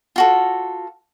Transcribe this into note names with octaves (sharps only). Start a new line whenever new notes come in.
F4 F#4 A4